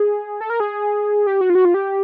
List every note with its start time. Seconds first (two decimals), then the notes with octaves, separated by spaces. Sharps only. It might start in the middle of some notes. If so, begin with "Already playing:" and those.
Already playing: G#4
0.41 A4
0.50 A#4
0.60 G#4
1.27 G4
1.41 F#4
1.50 F4
1.55 F#4
1.65 F4
1.74 G4